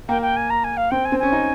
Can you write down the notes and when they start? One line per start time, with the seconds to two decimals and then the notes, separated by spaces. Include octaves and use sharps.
0.08 A#3 G5
0.21 G5
0.36 G#5
0.50 A#5
0.64 G#5
0.77 F5
0.90 C4 G5
1.05 G#5
1.12 C4
1.19 C#4 G#5
1.32 D#4